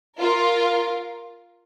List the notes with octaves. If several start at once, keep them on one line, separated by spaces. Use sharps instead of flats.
F4 A#4